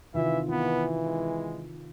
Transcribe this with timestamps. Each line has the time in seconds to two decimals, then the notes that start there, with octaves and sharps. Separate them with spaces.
0.14 C3 D#3 E3 F4 E5
0.49 E3 B3 F4
1.06 G#3